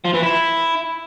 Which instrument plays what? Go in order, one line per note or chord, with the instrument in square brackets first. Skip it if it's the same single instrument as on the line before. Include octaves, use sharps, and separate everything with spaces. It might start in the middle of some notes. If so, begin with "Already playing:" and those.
[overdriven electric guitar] F3
E3
E4